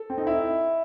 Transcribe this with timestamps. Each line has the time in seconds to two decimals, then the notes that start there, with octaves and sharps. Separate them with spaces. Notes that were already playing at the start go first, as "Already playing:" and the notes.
Already playing: A4
0.10 C4
0.18 D#4
0.27 E4